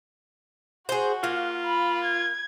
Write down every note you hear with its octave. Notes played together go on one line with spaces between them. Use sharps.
F#4 G#4 C5
A#3 F4
B5
G#6